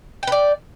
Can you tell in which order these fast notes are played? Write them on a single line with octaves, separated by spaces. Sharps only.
G5 B4 D5